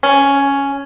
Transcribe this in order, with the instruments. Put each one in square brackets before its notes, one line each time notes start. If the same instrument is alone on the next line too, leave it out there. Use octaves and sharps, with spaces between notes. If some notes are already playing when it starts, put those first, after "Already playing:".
[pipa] C#4